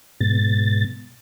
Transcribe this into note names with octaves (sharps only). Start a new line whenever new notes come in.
G#2 B2 A6